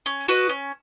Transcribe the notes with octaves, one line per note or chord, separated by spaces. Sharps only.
C#4
F#4 B4 D#5
C#4